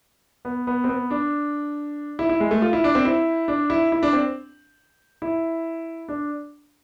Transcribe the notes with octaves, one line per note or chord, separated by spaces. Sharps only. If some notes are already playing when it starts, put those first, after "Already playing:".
B3
B3
C4
B3
D4
E4
E4
G#3
A3
F4
E4
D4
C4
E4
D4
E4
E4
D4
C4
E4
D4